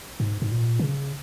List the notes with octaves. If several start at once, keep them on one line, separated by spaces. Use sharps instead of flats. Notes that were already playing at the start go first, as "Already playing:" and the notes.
G#2
G#2
A#2
D#3
C#3